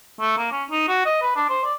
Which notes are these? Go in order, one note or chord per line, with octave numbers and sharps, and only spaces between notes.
A3
A#3
C#4
D#4
F#4
D#5
B4
D4
C5
D5